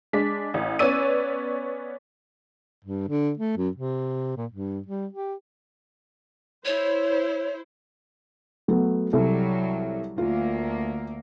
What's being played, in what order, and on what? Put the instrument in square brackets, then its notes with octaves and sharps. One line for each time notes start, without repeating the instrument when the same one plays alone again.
[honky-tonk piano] G#3 D4 B6
A1
B3 C#4 C#5 D5 E6 D#7
[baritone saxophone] G2
D3
A3
F#2
C3
A#2
G2
G3
G4
[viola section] E4 C5 [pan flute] C#5
[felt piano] F#3 A3 B3
[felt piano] C2 A4 [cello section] F#3 G3
[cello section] D2 A#3 [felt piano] F4